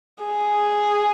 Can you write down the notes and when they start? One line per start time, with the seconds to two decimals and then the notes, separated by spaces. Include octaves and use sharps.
0.23 G#4